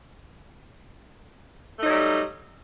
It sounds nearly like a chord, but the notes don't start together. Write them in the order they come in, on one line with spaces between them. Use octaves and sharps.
A3 D#4 F#3 G3